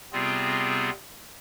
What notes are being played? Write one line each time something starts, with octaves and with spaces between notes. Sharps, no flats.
C3 G3 B3 C4 F4 G#4